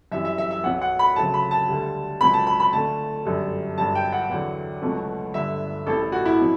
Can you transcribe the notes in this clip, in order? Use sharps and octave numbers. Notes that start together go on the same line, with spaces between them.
F#2 E3 G3 E5
E5
E5
E5
B1 B2 F#3 F#5
F#5
B5
D2 C#3 F#3 A5
B5
A5
D2 D3 G3
C#2 B2 F#3 B5
A5
B5
B5
D2 D3 A3 A5
G1 F#2 D3 G3
G1 G2 F#3 A5
G5
F#5
E2 D3 F#3
C#2 B2 F#3 A3
G1 G2 D3 E5
A1 A2 G3 A4
A4
F#4
E4
B2 F#3